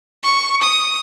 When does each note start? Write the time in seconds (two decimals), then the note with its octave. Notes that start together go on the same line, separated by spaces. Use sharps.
0.23 C#6
0.62 D#6